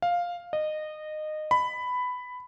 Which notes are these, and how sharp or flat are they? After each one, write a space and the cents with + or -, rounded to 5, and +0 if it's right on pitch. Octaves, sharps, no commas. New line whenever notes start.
F5 +5
D#5 -20
B5 +10